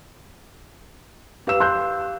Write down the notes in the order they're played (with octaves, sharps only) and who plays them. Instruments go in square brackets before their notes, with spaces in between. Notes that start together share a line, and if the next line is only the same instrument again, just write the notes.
[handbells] G4 F5 E6 [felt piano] B4 E7
[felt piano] C6 F#6 G6